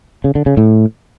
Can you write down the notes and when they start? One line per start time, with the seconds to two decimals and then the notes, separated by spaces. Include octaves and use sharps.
0.24 C#3
0.35 D3
0.46 C#3
0.57 A2